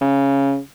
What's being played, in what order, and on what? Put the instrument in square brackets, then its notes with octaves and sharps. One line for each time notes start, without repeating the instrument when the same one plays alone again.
[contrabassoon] C#3